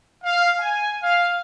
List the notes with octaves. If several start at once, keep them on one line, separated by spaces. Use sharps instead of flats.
F5
G#5
F5